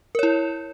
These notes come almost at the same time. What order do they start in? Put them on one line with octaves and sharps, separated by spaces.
A#4 C#5 E4